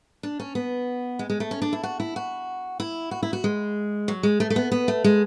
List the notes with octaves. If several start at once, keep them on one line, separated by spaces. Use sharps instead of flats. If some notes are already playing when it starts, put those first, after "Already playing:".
D4
C#4
B3
G#3
G#3
A3
C#4
D4
E4
F#4
E4
F#4
E4
F#4
E4
F#4
G#3
F#3
G#3
A3
A3
B3
B3
A3
G#3